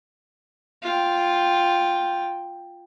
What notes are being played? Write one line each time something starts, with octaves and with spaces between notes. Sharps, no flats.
F4 G5